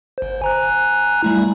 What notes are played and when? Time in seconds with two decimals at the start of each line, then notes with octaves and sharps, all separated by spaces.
0.18 G1 C5
0.42 G#5 A#5 F#6
1.23 G3 A3 E4